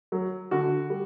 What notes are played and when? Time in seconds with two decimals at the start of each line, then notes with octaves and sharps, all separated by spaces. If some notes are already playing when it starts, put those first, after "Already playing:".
0.12 F#3
0.51 D3 F#4
0.90 G3